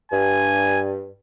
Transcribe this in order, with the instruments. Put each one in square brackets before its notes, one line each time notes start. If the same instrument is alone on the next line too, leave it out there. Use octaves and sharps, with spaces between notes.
[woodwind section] G2 [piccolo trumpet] G#5